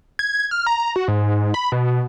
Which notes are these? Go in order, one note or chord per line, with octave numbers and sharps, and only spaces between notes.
G#6
F6
A#5
F#4
G#2
B5
B2